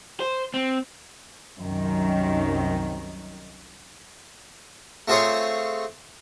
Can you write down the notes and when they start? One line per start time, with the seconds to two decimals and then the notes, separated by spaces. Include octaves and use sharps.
0.20 C5
0.54 C4
1.58 C2 F#2 D#3 F#3
5.08 A3 C4 F4 G#4 C5 C#5